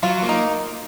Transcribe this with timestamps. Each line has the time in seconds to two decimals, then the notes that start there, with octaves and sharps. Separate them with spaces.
0.03 F#3 F4
0.22 A#3
0.29 D#4